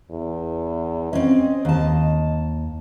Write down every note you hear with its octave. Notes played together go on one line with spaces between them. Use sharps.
E2
C4 C#4 D#5
D#2 A5